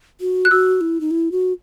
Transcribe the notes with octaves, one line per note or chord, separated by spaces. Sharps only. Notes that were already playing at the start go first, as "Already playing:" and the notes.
F#4
F#6
F#4 E6
E4
D#4
E4
F#4